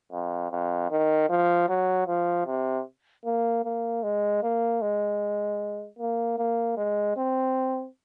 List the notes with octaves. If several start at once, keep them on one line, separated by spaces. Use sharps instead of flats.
F2
F2
D#3
F3
F#3
F3
C3
A#3
A#3
G#3
A#3
G#3
A#3
A#3
G#3
C4